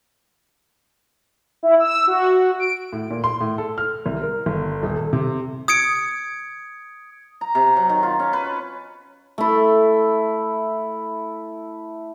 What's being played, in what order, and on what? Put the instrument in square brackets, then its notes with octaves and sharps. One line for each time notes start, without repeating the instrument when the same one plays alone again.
[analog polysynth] E4
E6
F#4
D7
[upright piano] A2
A#2
C6
A2
A4
F6
C2
A#4
G1
D#1
A4
C3
[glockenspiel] D#6 G#6 C#7 D7
[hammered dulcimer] A#5
C3
F#3
D#3
F4
C#4
B4
C#5
A3 E4